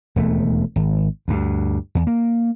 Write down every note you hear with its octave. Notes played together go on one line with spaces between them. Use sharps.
E1 D#2 A3
G#1
D2 G2
E2
A#3